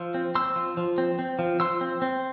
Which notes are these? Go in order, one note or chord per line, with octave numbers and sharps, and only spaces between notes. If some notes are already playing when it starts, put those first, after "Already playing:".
Already playing: F3 C6 E6
C4
C4 C6 E6
F3
F3
C4
C4
F3
F3 C6 E6
C4
C4